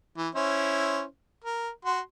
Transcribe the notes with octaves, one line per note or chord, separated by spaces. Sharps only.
E3
C#4 E4 C5
A#4
F#4 C6